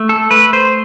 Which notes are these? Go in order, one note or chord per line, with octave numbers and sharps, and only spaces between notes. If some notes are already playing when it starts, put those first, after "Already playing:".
Already playing: A3
A4
A3 B4
C5